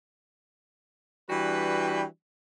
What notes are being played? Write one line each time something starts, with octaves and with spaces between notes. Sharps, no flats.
E3 G3 D4 F#4 B4 G5